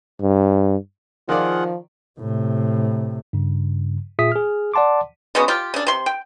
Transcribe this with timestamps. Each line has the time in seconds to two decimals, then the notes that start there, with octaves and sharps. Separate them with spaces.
0.21 G2
1.29 D#3 F3 F4 G#4 D5 F#5
2.20 A2 C3
3.33 G2 C#3
4.19 A#2 F4 G#4 E5 D#6 B6
4.32 G#4 F6
4.74 D5 F#5 A5 C6 D6
5.35 C#3 G#3 B3 F#4
5.48 F4 G4
5.74 C#3 D4
5.87 C3 C6
6.06 G5